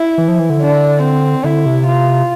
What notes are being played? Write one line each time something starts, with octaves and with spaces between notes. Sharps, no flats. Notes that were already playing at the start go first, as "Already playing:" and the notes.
Already playing: E4
E3
F3
E3
D3
D4
C4
D3 E4
C3
F4